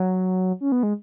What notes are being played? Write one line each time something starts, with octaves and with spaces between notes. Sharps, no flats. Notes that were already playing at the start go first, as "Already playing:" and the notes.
Already playing: F#3
C#4
B3
G#3